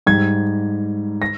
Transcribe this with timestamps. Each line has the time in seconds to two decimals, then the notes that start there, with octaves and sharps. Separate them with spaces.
0.07 G#2 G3 G#6
1.22 A#6